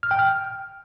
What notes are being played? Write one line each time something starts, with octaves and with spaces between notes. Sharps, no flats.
F6
G5
F6